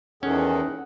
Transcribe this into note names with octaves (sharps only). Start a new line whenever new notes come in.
E2 D#3 E3 C#4 G#4 A4 F#5